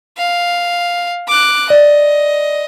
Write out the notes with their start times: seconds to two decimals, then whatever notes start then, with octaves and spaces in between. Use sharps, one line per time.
0.18 F5
1.28 D6 F#6
1.70 D5 D#5